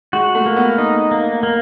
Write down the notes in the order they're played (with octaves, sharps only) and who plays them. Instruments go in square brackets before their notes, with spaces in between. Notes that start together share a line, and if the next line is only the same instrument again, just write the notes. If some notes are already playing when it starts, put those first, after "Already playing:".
[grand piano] G#3 [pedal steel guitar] F#4
[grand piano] A3
[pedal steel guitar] A#3
[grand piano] B3
[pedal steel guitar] D#4
A#3
A#3